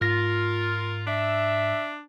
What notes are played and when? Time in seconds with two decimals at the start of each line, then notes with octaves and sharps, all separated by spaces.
0.01 G#2 F4 A#4 A#6
1.07 D4 E5